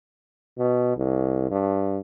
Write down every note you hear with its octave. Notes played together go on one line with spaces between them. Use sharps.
B2
C2
G2